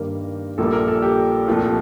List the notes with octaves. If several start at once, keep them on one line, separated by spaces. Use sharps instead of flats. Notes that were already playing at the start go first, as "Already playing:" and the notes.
Already playing: G2 D#3 G3 A#3 A#4
A#1 A#2 G3 A#3 A4
A#4
A4
G4
C2 A#2 F3 A3